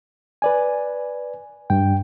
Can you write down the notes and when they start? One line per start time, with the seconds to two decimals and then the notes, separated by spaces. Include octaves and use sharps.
0.42 B4 D5 G#5
1.70 G2 G5